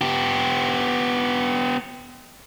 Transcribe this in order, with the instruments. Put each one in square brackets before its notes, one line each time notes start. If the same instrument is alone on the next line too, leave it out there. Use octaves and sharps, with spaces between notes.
[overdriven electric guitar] B3 G4